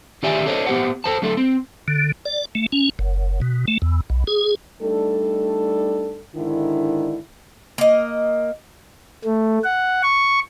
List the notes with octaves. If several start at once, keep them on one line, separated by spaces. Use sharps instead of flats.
D#3 C#4 G4 D5 E5 G#5
D4 A4 C5 C#5 D#5
B3 G4 C5 F#5
A4 C5 A5
D3 F#3 A3 A4
C4
D3
D5
A3
C#4
F#1
B2
A3
E2
B1
G#4
G3 A3 D4 D#4 A4
G#2 D3 D#3 D4 E4
A#3 D#5
A3
F#5
C#6